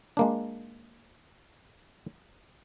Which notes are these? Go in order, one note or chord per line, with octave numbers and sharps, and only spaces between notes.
G#3 A#3 D4